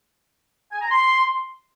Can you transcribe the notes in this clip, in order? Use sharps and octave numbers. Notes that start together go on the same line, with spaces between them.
G#5
A#5
C6